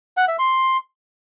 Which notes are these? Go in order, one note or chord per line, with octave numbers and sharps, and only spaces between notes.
F#5
E5
C6